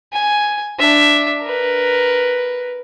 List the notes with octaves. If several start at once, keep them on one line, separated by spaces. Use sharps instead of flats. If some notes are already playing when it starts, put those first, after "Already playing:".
G#5
D4 E5
A#4 B4